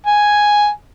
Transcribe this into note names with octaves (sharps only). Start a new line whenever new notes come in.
G#5